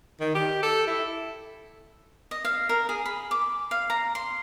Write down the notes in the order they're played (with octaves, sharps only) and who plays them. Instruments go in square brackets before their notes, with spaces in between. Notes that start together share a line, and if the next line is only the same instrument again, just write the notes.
[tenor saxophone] D#3
G4
A4
E4
[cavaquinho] D#5
F5
A#4
G#4
B5
D6
F5
A#5
C6